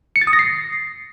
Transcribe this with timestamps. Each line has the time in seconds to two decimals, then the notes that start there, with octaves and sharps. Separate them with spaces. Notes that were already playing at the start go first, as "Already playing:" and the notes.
0.16 C#7
0.21 A6
0.27 D#6
0.33 A#6
0.39 C7